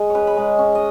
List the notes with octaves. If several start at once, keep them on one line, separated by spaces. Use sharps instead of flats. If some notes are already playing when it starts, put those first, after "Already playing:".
Already playing: G#3 D#5
C#4 B4 C#5
B5
G#3 A#5
C#4
D#5